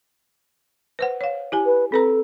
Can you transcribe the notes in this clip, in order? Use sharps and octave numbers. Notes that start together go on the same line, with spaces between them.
B4 C5 F#5
C#5 F5
E4 G4 G#5
B4
C4 A4 B4 A#5